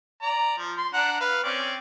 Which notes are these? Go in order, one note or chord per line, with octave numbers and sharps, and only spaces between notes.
D5 A#5
F3
C6
D4 F#5 A#5
B4 F5
C4 C#4 D5